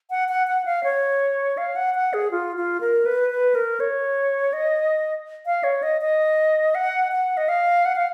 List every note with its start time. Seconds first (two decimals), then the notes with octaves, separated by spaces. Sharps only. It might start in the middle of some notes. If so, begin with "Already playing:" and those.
0.10 F#5
0.29 F#5
0.47 F#5
0.65 F5
0.84 C#5
1.58 F5
1.76 F#5
1.95 F#5
2.14 G#4
2.31 F4
2.56 F4
2.81 A#4
3.06 B4
3.30 B4
3.55 A#4
3.80 C#5
4.53 D#5
5.46 F5
5.64 C#5
5.83 D#5
6.01 D#5
6.75 F#5
7.12 F#5
7.37 D#5
7.49 F5
7.85 F#5
7.96 F5